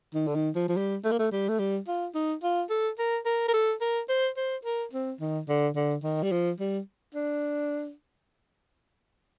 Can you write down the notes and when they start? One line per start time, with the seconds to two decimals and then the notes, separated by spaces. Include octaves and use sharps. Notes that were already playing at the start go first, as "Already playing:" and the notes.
0.14 D#3
0.27 D3
0.35 D#3
0.55 F3
0.69 F3
0.77 G3
1.04 A3
1.12 A#3
1.19 A3
1.32 G3
1.49 A3
1.59 G3
1.87 F4
2.15 D#4
2.43 F4
2.70 A4
2.99 A#4
3.25 A#4
3.48 A#4
3.54 A4
3.81 A#4
4.09 C5
4.37 C5
4.65 A#4
4.93 C4
5.20 D#3
5.48 D3
5.76 D3
6.03 D#3
6.23 G3
6.32 F3
6.59 G3
7.15 D4